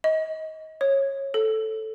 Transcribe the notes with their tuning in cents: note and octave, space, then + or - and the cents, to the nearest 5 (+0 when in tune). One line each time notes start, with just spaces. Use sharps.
D#5 +25
C#5 -20
A4 -5